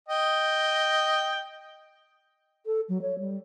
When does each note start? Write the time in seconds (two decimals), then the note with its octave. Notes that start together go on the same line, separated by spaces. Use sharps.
0.08 D#5 G5
2.66 A4
2.89 F#3
3.02 C#5
3.19 G3